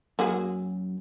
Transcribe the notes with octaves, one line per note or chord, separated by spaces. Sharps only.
F#2 A#3 F#4 G#4